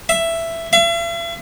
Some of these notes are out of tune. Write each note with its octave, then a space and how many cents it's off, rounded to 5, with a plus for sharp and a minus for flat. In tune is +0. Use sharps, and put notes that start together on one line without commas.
E5 +10
E5 +45